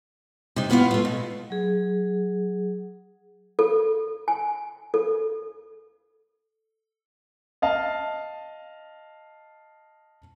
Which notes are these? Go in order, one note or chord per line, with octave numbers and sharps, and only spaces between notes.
C3 D#4
A2 B3 F4 C#5 F5
A3 F4
B2
F#3 G#4
A4
G#5
A4
D#5 F5 A5